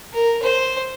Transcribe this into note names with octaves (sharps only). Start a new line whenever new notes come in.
A#4
C5